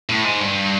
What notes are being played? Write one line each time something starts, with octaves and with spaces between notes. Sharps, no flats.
A2
G#2
G2